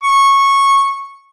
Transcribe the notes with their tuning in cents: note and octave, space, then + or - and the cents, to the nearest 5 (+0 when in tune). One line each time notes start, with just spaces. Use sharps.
C#6 -10